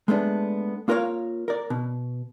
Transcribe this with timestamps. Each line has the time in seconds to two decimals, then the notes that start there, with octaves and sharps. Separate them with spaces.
0.08 G#3 A3 B3 D4
0.88 A#3 F4 A#4 C5 C#5 F5
1.48 A#4 D5
1.70 B2